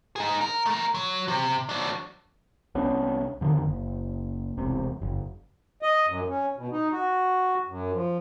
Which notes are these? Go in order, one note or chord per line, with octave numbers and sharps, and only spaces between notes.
D#4 G#4
A#4
A3 A#4
F#3
C3
F#3 D4
C2 B3 C#4 D4
F2 D3 D#3
F#1
E1 C2 C3
F#1
D#5
F#2
C#4
B2
D#4
F#4
F#2
F3